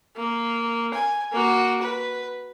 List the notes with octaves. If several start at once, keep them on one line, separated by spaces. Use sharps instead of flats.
A#3
G#5
A#3 F#4
B4